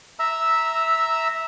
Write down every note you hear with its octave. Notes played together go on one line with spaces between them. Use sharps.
E5 A#5 E6